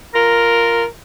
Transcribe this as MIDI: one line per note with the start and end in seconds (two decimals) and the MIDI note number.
0.14 0.83 65
0.14 0.83 70